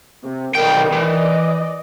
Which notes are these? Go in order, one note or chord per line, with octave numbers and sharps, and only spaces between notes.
C3
B1 D#3 G3 G5
E3 D5 D#5